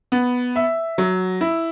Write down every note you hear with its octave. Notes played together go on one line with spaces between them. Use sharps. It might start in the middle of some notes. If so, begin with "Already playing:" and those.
B3
E5
F#3
E4